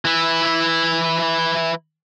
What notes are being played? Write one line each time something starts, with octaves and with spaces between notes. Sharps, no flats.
E3 E4